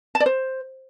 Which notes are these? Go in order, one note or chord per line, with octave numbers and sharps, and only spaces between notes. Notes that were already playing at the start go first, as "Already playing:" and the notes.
A5
D5
C5